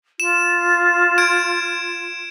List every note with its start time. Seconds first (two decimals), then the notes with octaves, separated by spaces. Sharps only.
0.20 F4 E7
1.18 G#6 D7 E7